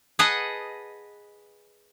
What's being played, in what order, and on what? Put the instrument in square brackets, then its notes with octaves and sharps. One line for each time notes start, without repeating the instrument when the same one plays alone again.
[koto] G#4 B4 D#5 F#5 A5